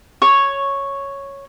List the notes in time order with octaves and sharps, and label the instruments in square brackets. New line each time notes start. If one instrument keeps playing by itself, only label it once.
[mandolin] C#5